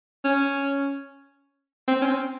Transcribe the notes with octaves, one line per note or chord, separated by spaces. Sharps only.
C#4
C4
C#4
C4